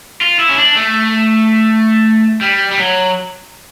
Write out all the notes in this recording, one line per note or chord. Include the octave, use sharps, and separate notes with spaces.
F4
E4
C#4
D4
A3
G3
G3
F#3